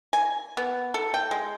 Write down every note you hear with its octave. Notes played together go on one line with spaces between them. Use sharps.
G#5
B3
A4
G5
G#3